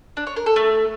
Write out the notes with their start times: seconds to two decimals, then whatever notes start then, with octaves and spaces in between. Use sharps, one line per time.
0.17 D4
0.27 C#5
0.36 A#4
0.46 A4
0.56 A3